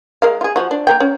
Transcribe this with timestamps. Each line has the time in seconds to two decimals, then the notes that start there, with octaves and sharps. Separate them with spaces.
0.22 G#3 A#4 F5
0.41 F4 G#4
0.56 F3 F#4
0.71 D4
0.87 A#3 A#4 G5
1.00 C#4